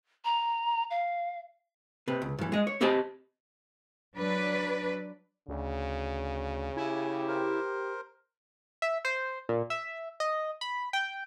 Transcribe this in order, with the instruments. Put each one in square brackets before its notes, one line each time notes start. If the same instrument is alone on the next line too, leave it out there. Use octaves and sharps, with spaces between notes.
[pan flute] A#5
F5
[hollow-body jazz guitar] C3 B4
C#2
G2 E3
G#3 D#5
C#5
C4 G4 D#5 G#5 A5 B5
[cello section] F#3 D4 B4 D5
[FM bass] D2 [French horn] C#3
[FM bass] E4 [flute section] G4 [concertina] G#5
[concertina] A#4 C5
[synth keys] E5
C5
A#2
E5
D#5
B5
G5